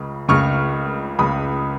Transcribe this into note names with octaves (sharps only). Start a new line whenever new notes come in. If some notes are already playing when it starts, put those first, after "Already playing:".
Already playing: C#2 C#3
C#2 C#3 C#6 F6
C#2 C#3 B5 D#6